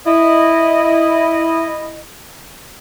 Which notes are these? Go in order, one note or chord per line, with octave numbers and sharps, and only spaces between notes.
E4 D#5